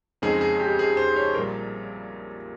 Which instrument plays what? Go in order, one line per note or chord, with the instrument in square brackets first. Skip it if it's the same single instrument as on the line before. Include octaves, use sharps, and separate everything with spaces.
[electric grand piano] F2 C#3 G#3 C4 D#4 [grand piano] G#4
[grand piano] G#4
G4
G#4
C5
C#5
[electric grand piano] A#1 A#2 G3 [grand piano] A#4